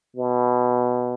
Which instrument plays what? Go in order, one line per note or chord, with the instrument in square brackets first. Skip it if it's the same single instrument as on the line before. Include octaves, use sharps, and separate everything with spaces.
[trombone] B2